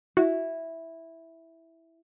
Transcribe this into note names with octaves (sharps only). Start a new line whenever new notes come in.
E4 F#4